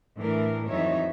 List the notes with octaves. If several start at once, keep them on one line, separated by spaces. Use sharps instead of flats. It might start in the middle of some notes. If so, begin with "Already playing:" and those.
A2 E3 D4 A#4
F2 E3 F#3 D#4 C#5 E5